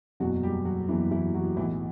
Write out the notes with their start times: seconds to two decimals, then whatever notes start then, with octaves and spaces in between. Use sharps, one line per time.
0.20 F#1 E2 B2 F#3 F#4
0.43 G3 G4
0.65 F#3 F#4
0.88 F#1 E2 B2 E3 F#3 E4
1.11 E3 E4
1.34 F#3 F#4
1.57 B1 A2 E3 E4